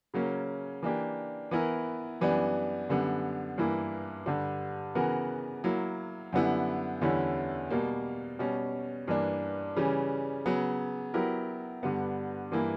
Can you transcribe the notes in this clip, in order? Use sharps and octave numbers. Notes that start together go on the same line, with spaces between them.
C#3 F#3 A#3 C#4
E3 A#3 D4 G4
E3 B3 E4 A#4
F#2 E3 G3 B3 D4
F#2 D3 G3 B3
G2 E3 A#3 E4
G2 D3 G3
C#3 E3 B3 F#4 A#4
F#3 A#3 E4
F#2 D3 G3 B3 E4
E2 D3 G3 C#4 E4
B2 G3 A#3
B2 G3 C#4
G2 E3 A#3 D4
C#3 E3 G3 C#4
C#3 F#3 B3
F#3 B3 E4 G4 A#4
G2 D3 G3 B3
G2 E3 A#3 E4